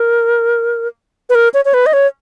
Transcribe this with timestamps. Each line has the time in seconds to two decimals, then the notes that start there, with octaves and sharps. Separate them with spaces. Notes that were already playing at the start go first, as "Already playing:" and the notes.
Already playing: A#4
1.30 B4
1.35 A#4
1.54 C#5
1.65 C#5
1.74 B4
1.86 D#5
1.93 C#5